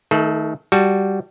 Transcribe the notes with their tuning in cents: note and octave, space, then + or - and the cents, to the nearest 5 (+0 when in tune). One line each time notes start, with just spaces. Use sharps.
D#3 +20 A3 +10 A4 -35
G3 -5 F#4 +0 A5 +0